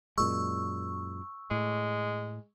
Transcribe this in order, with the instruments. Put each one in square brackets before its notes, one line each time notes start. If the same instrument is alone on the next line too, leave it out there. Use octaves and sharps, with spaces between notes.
[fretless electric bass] F#2 A#2 G#3 [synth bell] C#6 E6
[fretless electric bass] A2 [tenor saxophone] G#3